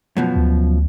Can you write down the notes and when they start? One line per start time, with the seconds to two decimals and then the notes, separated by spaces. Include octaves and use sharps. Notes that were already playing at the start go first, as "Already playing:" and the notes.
0.17 F#2 B2 F3
0.36 D2